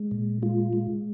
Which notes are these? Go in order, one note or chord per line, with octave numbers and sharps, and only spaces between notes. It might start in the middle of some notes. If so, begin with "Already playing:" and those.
Already playing: G#3
A#2
G#3 F4
G#3